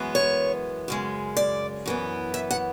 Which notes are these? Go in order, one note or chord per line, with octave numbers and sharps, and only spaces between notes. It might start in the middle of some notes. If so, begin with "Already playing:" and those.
Already playing: F#2 E3 G#3 B3
C#5
F#2 C#3 G#3
D5
F#2 E3 B3
E5
F#5